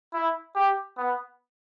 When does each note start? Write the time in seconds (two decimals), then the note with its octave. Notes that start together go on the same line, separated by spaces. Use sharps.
0.13 E4
0.55 G4
0.97 B3